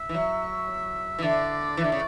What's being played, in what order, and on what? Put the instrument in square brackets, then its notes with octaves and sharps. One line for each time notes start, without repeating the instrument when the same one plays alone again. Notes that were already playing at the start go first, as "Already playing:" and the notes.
Already playing: [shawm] E5
[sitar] E3
F#3
E3
[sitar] D3 [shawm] D5
[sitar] E3
D3
C#3